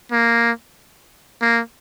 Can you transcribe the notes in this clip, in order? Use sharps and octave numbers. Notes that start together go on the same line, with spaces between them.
A#3
A#3